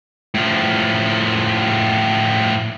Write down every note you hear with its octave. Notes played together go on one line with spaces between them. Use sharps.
A2 F3